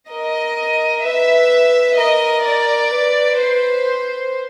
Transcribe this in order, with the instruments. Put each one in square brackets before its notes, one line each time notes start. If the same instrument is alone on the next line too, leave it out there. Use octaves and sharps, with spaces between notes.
[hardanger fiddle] A#4 [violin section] D#5
[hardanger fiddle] B4 [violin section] E5
[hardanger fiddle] A#4 [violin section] D#5
[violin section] D5
[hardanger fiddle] B4
[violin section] C5